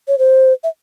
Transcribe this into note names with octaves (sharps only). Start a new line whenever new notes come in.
C#5
C5
E5